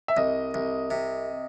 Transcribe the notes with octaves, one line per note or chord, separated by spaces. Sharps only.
E5
C2 D#5
C2
C3